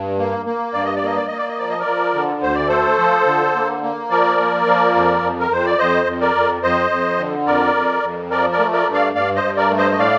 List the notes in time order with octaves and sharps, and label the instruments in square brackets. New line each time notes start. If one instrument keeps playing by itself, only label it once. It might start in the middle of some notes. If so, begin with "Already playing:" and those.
Already playing: [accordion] G2
A#3
A#3
G2 D5
D#5
D5
A#3 D#5
D5
A#3 D#5
D5
D#5
F3 D5
D#5
A#4 D5
F3
D3
D2 C5
D5
A3 A4 C5
F3
D3
A#3
A#3
F3 A#4 D5
A#3
F3
F2
F2
A#4
F2 C5
D5
F2 C5 D#5
F2
A#4 D5
F2
F2 C5 D#5
F2
D3
F2 A#4 D5
F2
F2
F3 A#4 D5
A#4 D5
A3
A#4 D5
G2
D5 F5
G2 D5 F5
C5 D#5
G2
A#4 D5
A3
C5 D#5
D#5
A2 D5 F5